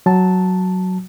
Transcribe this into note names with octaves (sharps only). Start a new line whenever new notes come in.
F#3 A5